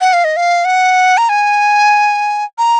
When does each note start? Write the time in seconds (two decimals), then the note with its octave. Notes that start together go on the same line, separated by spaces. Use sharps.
0.01 F#5
0.13 F5
0.24 D#5
0.37 F5
0.65 F#5
1.18 A#5
1.29 G#5
2.58 A#5